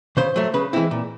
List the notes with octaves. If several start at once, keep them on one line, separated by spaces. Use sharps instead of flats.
C#3 C5
F#3 A3
C#3 B4
E3 G#3 C4 E4
A#2